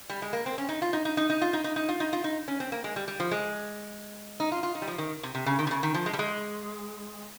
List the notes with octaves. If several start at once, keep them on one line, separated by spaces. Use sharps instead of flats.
G3
G#3
A#3
C4
C#4
D#4
F4
D#4
D#4
D#4
D#4
F4
D#4
D#4
D#4
F4
D#4
F4
D#4
C#4
C4
A#3
G#3
G3
G3
F3
G#3
D#4
F4
F4
D#4
G3
F3
D#3
C3
C3
C#3
D#3
C3
C#3
D#3
F3
G#3
G3
G#3